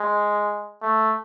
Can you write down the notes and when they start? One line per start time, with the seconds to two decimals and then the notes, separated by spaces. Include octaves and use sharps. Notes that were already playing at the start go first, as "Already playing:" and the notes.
Already playing: G#3
0.82 A3